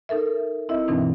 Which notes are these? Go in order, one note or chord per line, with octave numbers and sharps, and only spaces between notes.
D#4 A4 A#4 E5
C4 E4 D#5 E5
G2 B2 E3 C4 D4 D#4